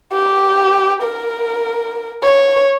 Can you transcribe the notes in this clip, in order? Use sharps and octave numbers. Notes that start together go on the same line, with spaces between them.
G4
A#4
C#5